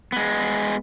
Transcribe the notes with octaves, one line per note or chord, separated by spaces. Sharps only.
G#3 B3